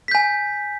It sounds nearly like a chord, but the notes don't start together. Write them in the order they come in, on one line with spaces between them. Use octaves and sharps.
B6 G6 G#5